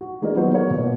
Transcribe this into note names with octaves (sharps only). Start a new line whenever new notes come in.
F#4
E3 G#3 A#3 D4 A#4 D#5
D#3 F#3 B3 F4 F#4 C5
A#3 B3 C#5 F5
B2